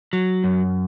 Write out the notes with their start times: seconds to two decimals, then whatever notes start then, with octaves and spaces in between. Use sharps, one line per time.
0.13 F#3
0.44 F#2